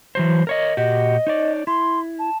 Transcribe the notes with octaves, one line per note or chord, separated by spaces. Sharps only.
E3 F#3 C5
A#4 C#5 D#5
A#2 F#4 G4 D#5
D#4 C#5 D5
E4 C6
A5